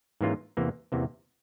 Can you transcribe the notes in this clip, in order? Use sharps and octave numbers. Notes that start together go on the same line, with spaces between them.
G#2 E3 A#3 C#4 F4
E2 C3 E3 A#3
E2 C3 E3 A#3